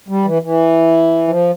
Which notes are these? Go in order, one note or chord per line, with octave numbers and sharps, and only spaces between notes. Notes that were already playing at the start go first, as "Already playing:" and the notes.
G3
E3
E3
F3